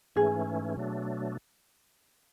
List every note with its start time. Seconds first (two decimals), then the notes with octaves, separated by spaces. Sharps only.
0.16 G#2 E3 A3 C#4 G#4
0.77 B2 F#3 A3 D4